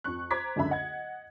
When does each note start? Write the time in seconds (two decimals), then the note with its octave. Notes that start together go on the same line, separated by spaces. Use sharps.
0.04 F2 C#6 F#6
0.31 C5 A#5 D6 G#6 B6
0.56 C#2 F#2 D3 E5 B5
0.70 D#5 F#5 G#6